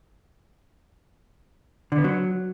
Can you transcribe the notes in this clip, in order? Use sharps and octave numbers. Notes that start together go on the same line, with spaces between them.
D3
B3
F#3